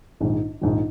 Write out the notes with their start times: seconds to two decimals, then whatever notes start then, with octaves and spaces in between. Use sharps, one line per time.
0.20 A#1 G#2 D#3
0.61 A#1 G#2 D#3